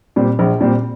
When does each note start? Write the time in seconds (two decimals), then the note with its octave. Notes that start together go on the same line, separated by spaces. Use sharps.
0.16 A#2 G3 C4
0.39 A#1
0.61 A#2 G3 C4